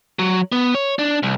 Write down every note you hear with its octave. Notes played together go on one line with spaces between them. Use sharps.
F#3
B3
C#5
D4
C2